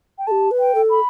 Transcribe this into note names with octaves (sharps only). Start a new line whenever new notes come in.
G5
G4 A4 A5
B4
G5
A4
B5